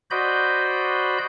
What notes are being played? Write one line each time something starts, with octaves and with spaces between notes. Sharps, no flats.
F#4 C5 D5 D#5 B5 G6